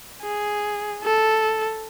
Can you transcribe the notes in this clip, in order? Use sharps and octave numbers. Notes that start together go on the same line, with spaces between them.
G#4
A4